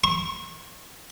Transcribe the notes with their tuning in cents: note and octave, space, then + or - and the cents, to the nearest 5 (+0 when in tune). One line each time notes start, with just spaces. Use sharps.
C#6 -35